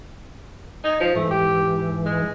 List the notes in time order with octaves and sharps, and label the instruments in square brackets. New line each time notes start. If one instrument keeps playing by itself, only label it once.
[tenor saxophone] D#4 [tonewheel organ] G#5
[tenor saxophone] F3 [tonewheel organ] D#4
[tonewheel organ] G#2 E3 [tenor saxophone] A3
[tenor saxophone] G4
G#3